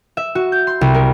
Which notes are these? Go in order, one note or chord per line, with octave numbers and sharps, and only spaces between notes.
E5
F#4
G6
C6
C2
A#4